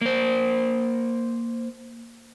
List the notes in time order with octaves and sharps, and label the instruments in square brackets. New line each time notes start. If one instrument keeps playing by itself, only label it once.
[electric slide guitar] A#3 C5